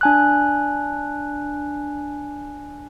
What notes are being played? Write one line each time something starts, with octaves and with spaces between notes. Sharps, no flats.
D4 G#5 F#6